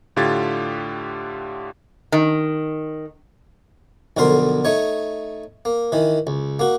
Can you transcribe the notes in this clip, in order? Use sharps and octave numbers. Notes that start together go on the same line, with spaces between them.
A2 D3 F4 G4 G#6 A6
D#3
B1 F2 D3 A#4 C6
A3 D#4 C#5
A#3
D#3 E3
C#2
A#3 F#4